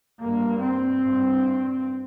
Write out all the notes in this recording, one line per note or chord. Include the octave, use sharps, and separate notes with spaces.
G2 A#3
C4
G2